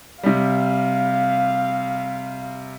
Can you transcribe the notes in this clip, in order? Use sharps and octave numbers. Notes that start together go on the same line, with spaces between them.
C3 G3 F5